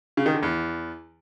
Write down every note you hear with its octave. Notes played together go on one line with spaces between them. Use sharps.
C#3
D#3
D3
E2